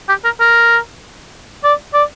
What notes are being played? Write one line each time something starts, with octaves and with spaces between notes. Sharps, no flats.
G4
A#4
A#4
D5
D5